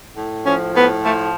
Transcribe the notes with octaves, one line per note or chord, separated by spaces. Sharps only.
A2
F3 C#4
A2 B3
F3 A3